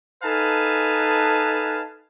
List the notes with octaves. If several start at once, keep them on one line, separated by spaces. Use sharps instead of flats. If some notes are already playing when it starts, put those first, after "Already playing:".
D#4 A4 B4 F5 G#5 A5